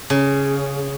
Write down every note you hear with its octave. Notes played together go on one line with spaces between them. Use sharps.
C#3